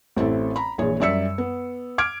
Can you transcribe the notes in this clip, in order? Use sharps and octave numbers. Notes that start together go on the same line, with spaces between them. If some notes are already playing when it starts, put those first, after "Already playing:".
A1 C4 E4 A4
A#5 B5
A#1 E3 G#4 C#5
F#2 G3 D5 E5 E6 C#7
B3
D6 F6 G#6 D7